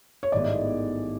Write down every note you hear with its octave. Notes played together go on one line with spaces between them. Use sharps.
C#5
A1 G#2 D#3 G#3 B3 D5